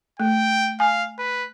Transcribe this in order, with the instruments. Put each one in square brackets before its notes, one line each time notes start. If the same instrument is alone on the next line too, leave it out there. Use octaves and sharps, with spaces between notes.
[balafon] A3 [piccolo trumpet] G5
[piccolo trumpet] F5 [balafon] G#5
[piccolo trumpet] B4